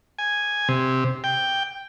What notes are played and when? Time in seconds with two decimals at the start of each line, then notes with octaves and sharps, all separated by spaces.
0.19 G#5
0.69 C3
1.24 G5